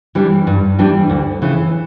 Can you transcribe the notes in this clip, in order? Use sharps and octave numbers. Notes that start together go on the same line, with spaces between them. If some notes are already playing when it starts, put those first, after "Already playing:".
E3 G3 D4
G2
E3 G3 D4
D2
C#3 E3